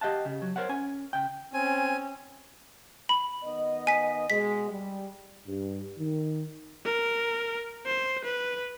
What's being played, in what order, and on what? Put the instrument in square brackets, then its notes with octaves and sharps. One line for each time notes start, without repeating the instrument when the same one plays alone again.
[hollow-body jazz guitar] G4 D#5 F5 F#5 A5
C#3
F#3
A#4 C5 C#5 F#5
C#4 G#5
C#3 G5
[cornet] C4 [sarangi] C#4 [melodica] G#5
[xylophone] B5
[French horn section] D#3 B3 D#5
[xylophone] G#5 B6
[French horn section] B2 G#3 [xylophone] B6
[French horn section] G3
[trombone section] G2
D#3
[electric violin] A#4
C5
B4